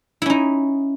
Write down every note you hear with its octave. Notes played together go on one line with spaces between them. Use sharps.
C#4 D#4 E4